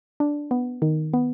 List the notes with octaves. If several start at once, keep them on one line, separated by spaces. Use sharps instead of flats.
D4
B3
D#3
B3